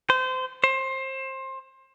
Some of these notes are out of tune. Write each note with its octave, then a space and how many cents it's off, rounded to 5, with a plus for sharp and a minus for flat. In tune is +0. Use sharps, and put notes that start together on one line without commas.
C5 -25
C5 +25